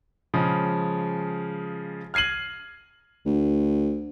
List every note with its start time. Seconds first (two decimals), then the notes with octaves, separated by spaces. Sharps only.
0.34 C#3 F3 G#3
2.14 F6 G#6 C7 D#7 F#7
3.26 D2